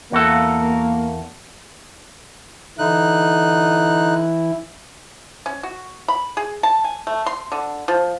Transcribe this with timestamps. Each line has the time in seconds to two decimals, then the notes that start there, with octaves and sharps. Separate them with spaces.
0.12 E2 A#3 F#4 A4
2.78 D3 E3 D#4 E4 F#6
5.46 C#4
5.63 F#4
6.08 B5
6.37 G#4
6.63 A5
6.84 G#5
7.07 A3
7.26 C6
7.52 D3
7.88 F3